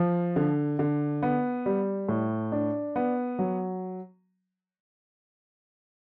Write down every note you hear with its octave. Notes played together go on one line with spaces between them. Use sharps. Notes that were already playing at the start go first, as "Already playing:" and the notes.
Already playing: F3
D3
D3
B3
G3
A2
D4
B3
F#3